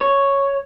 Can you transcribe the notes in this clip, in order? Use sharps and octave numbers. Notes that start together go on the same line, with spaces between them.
C#5